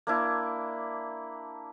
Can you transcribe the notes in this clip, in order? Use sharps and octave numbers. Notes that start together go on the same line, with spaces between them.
A#3 D4 E4